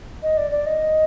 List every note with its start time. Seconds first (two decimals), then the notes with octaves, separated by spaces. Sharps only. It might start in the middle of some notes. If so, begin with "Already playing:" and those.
0.23 D#5
0.37 D5
0.51 D5
0.66 D#5